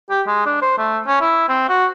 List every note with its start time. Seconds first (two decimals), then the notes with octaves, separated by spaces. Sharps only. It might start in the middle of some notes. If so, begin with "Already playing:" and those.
0.10 G4
0.27 G#3
0.46 D4
0.62 C5
0.78 A3
1.07 C#4
1.21 E4
1.49 C4
1.69 F#4